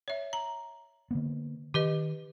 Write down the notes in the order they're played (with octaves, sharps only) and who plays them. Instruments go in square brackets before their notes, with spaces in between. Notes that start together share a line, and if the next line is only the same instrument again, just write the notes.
[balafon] C#5 E5
A#5
[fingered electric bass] D3 A#3 B3
[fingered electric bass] D#3 [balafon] G4 B4 D#5